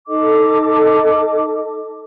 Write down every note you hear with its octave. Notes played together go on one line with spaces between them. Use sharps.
D#4 A4 D#5 D6